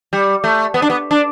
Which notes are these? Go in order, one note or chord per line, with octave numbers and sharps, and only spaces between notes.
G3
A3
B3
D4
B3
D4